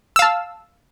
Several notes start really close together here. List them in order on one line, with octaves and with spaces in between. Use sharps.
E6 F5 A5